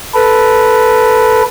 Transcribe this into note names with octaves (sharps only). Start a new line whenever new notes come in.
A4 B4